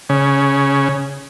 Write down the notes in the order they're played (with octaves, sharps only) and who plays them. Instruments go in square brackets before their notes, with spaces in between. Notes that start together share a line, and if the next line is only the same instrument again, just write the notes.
[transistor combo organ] C#3